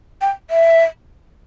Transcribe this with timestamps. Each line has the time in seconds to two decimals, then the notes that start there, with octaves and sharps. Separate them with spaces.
0.21 G5
0.50 E5